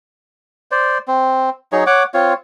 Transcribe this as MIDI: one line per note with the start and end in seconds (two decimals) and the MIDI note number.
0.71 0.98 72
0.71 0.98 74
1.08 1.50 60
1.72 1.84 54
1.72 1.84 63
1.72 1.84 68
1.72 1.84 73
1.86 2.03 73
1.86 2.03 78
1.86 2.03 86
2.14 2.34 60
2.14 2.34 65
2.14 2.34 73